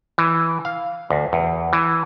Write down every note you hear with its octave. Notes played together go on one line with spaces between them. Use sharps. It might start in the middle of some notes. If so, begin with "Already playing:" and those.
E3
F5
D2
E2
E3